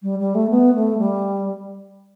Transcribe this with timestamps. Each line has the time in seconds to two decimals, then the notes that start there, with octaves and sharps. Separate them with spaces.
0.02 G3
0.19 G3
0.35 A3
0.50 B3
0.75 A3
0.98 G3